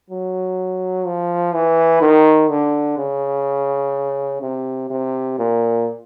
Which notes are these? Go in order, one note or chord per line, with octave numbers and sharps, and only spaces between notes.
F#3
F3
E3
D#3
D3
C#3
C3
C3
A#2